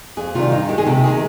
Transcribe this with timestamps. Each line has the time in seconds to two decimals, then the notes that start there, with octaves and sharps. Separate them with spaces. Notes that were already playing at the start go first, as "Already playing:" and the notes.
0.17 F2 G#4
0.34 C3 D#3 G3 F4
0.51 G2 D#4
0.69 D#3 G#3 G4
0.78 G#4
0.86 C3 G4
1.04 D#3 G#3 G#4